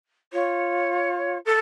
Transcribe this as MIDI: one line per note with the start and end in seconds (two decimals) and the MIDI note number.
0.33 1.38 65
0.33 1.38 73
1.45 1.58 69